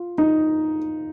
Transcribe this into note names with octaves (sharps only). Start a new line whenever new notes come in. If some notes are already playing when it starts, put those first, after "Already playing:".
Already playing: F4
D#4